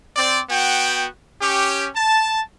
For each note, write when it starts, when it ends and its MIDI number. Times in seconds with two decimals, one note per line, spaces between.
0.17 0.40 60
0.17 0.40 74
0.50 1.05 59
0.50 1.05 66
0.50 1.05 79
1.41 1.88 61
1.41 1.88 67
1.95 2.41 81